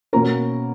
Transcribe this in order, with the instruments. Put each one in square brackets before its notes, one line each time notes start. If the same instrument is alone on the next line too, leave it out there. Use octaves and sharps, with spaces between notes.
[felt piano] B2 A#3 C#4 A#4 A#5